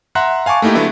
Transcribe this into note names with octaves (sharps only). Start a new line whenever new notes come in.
E5 F#5 A#5 C6 F#6
F5 G#5 A5 C#6 D6
A3 A#3 D#4 E4 G4
D3 F#3 A3 B3 D4 E4